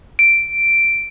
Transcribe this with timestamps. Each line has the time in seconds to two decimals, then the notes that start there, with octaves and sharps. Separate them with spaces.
0.19 D7